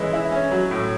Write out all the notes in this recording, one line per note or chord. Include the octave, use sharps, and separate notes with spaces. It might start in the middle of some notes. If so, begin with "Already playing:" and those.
Already playing: E3 G#3 C#4
E4
C#4
F#3
A2